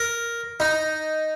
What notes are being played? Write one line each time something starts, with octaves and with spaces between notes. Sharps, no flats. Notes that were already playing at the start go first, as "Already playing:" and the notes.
Already playing: A#4
D#4